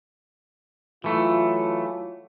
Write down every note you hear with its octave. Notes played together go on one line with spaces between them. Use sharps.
E3 F#3 A3 F4